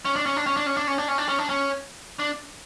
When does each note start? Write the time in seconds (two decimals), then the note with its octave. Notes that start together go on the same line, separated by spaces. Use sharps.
0.05 C#4
0.16 D4
0.26 C#4
0.36 D4
0.46 C#4
0.57 D4
0.66 C#4
0.77 D4
0.87 C#4
0.98 D4
1.08 C#4
1.18 D4
1.28 C#4
1.39 D4
1.49 C#4
2.19 D4